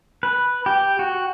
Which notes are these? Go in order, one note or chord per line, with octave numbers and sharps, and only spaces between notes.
B4
G4
F#4